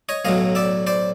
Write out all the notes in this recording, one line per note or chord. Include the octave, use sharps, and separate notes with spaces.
C#5 D#5
B1 A2 F#3 D#5 F5
D5 E5
C5 D5